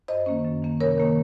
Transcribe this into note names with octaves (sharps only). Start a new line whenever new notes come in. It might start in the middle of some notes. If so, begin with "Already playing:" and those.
F#2 C5 D#5
D#3 A#3 C#4
F#2
D#3 A#3 C#4
C3 A#4 C#5
D#3 A#3 C#4